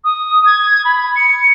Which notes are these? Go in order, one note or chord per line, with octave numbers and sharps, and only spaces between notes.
D#6
G#6
B5
G#6
C#7